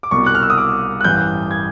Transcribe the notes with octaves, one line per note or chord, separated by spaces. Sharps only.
D6
C2 B2 C#6
F#6
F6
E6
D#6
D6
F#6
A1 G2 E3 G6
G#6